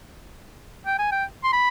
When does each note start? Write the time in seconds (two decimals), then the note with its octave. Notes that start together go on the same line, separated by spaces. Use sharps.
0.86 G5
0.99 G#5
1.12 G5
1.44 C6
1.53 B5